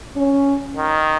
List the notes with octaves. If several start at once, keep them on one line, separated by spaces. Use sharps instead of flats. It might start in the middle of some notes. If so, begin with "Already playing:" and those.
C#4
D#3